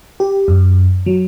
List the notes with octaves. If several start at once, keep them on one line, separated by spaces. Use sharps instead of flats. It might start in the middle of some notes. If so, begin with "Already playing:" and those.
G4
F#2
F#3